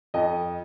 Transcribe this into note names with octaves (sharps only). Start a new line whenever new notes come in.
F2 D#5